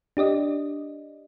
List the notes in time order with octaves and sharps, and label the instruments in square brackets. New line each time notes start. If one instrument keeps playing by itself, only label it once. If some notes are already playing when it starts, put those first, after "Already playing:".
[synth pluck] D4 G4 D5 D#5